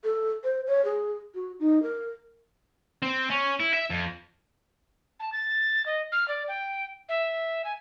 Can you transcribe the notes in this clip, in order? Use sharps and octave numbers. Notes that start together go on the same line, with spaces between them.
A4
C5
C#5
G#4
F#4
D#4
A#4
C4
C#4
E4
E5
F2
A5
A6
D#5
F6
D5
G5
E5
G#5